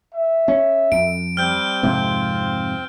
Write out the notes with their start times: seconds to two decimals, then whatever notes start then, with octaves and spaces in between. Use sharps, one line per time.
0.14 E5
0.48 C#4
0.92 F2 D7
1.37 G3 C4 F6 G6
1.83 F2 G#2 C3 F4